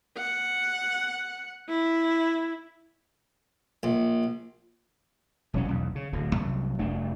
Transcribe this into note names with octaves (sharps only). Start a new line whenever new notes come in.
F#5
E4
A#1
E1 F#3 C4 C#4
B1 E2
C#3
D1 D2 D3
C2 F#2
F1 G2 A3 D4